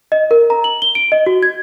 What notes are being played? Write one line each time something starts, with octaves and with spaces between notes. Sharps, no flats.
D#5
A#4
A#5
F#7
G7
D7
D#5
F#4
G#6